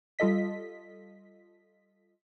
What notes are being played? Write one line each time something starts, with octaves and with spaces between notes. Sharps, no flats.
G3 F4 A4 D#5 B6